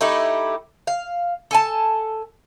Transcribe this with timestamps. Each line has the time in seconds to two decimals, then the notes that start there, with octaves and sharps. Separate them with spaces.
0.01 A3 D#4 E4 G4
0.87 F5
1.51 A4 G#5 A5